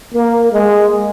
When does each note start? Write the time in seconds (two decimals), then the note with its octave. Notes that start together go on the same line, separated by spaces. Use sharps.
0.13 A#3
0.52 G#3